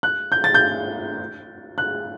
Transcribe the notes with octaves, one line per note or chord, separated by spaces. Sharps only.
F#6
G6
A6
G6
F#6